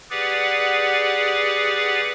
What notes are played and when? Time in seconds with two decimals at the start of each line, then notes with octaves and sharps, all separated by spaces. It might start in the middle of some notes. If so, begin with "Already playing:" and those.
0.10 G4 G#4 B4 D5 F#5